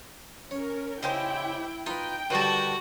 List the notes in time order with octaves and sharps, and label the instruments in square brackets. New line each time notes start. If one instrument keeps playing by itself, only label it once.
[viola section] C#4 A#4 [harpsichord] C#5
[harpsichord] C#3 [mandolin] D#4 G4 C5 [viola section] E4 G5
[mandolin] D#4 [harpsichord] F4 B4 [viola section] G5
[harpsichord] D3 D#3 G3 [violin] F#4 [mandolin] B4 A5